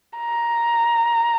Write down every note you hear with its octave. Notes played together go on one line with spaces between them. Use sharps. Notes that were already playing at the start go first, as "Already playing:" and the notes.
A#5